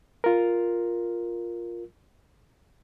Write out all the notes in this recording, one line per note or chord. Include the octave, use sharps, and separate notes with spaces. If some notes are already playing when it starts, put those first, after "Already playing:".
F4 A#4